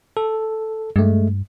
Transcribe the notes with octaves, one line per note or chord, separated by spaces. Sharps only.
A4
G2 G#3 A3